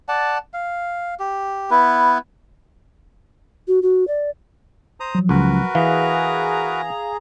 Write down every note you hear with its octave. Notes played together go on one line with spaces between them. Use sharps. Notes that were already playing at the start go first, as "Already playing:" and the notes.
D5 F#5 A5
F5
G4
B3 E4 B4
F#4
F#4
D5
C5 A#5 D#6
F3 F#3
C#2 F#4 A#4 B4
E3 G#4 F5 A#5